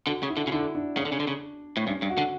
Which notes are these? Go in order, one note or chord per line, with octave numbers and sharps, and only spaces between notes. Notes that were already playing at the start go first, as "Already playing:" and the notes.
D3 F#4
C#3
E4
D3
F#4
C#3
D3 E4
D4
C#3
D3
C#3
D3
C#3
A2
G2 C#4
G2
F#4
D3